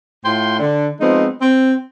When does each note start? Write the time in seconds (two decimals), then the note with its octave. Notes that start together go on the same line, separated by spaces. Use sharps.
0.25 A2 F4 G5 C6
0.59 D3
1.01 F3 G#3 B3 C4 D#4
1.41 C4